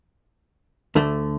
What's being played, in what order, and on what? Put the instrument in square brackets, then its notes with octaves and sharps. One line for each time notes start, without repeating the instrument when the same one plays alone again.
[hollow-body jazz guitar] D2 D3 A3